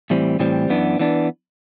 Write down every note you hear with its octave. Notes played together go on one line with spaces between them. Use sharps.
A2 E3 G3 C4
A2 E3 G3 C4
F#2 E3 B3 D4
E3 B3 D4